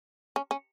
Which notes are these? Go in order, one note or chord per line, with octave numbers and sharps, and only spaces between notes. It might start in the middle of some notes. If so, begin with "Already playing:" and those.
C#4
C#4